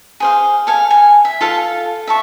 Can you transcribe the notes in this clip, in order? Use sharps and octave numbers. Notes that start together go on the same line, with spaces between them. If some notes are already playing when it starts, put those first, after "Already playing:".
G#4 C5 F5
A4 F5 G#5
G#5
E5
F4 A4 F5 A5
E5 A5 C#6